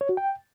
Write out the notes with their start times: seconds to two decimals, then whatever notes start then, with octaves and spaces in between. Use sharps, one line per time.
0.01 C#5
0.09 F#4
0.17 G5